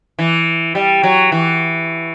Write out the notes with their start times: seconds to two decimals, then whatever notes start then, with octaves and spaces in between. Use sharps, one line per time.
0.19 E3
0.75 G3
1.03 F#3
1.32 E3